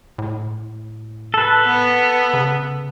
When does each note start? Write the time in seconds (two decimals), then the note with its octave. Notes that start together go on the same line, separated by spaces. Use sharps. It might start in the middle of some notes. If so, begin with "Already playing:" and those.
0.18 A2
1.34 A4 B4
1.65 B3
2.34 C#3